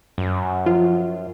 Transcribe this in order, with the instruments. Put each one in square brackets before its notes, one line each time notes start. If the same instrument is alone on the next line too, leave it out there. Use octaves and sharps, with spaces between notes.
[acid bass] F#2
[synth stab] F3 F4